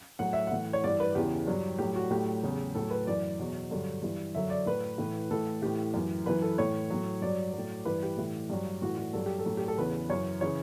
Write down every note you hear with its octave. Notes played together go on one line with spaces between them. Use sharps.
A2 F#3 F#5
E5
A2 E3 F#5
C#5
G2 E3 D5
B4
E2 C#3 E3 G4
G2 F#3
A2 F#3 G4
F#4
A2 F#3 G4
E2 C#3 F#3
A2 F#3 A4
B4
F#2 E3 D5
E2 B2 F#3
G2 D3 F#3
G2 E3
F#2 D3 F#3 E5
D5
A2 F#3 B4
A2 E3
A2 E3 A4
A2 E3 G4
F#2 E3
F#2 E3 B4
A4
A2 E3 C#5
A2 F#3
G2 F#3 D5
A2 F#3
G2 E3 B4
G4
A2 E3
G2 F#3
A2 E3 F#4
F#4
G2 F#3 A4
G4
A4
A2 F#3
G4
A4
E2 C#3 E3 B4
F#2 E3 C#5
C#3 E3 C#5